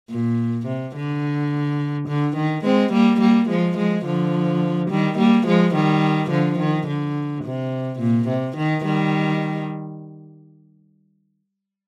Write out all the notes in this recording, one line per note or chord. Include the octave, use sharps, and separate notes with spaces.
A#2
C3
D3
D3
D#3
G#3 C4
G3 A#3
G3 A#3
F3 G#3
F3 G#3
D3 F3
D#3 G3
G3 A#3
F3 G#3
D#3 G3
D3 F3
D#3
D3
C3
A#2
C3
D#3
D#3 G3